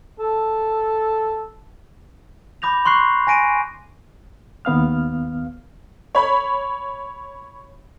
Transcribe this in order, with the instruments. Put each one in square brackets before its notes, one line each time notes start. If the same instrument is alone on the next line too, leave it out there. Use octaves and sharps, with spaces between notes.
[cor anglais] A4
[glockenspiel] B5 D6 G6 A#6 F7
C6 C#6 F#6 C7
G#5 A#6 D7 D#7
[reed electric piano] D#2 B3 F5 F6
[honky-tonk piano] C#5 B5